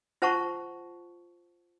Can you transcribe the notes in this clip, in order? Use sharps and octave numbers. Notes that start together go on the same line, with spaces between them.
F4 C5 F#5 A5 A#5 C#6